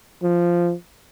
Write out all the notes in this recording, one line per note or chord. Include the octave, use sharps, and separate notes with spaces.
F3